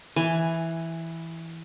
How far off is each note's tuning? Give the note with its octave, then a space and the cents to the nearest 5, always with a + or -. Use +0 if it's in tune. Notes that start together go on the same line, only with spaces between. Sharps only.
E3 +0 G#5 +0